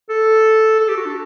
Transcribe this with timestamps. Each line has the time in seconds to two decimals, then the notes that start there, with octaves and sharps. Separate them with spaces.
0.10 A4
0.80 A4
0.89 G4
0.97 F#4
1.05 D4